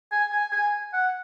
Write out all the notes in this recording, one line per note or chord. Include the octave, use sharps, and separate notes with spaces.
G#5
G#5
G#5
F#5